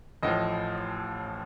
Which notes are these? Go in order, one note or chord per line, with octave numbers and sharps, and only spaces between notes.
A1 A2 F3 D#5